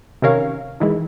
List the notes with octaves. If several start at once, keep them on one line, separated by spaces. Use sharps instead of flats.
C3 D#3 C#4 A#4 C#5 F5
D#3 E3 G#3